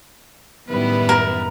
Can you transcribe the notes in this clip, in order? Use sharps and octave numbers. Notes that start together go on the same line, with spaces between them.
F#2 A2 D#3 G3 B3 E4 B4
A#4